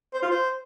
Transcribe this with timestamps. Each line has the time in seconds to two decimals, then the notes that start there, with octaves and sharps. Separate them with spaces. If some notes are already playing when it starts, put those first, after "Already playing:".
0.14 C5
0.22 F4
0.31 C5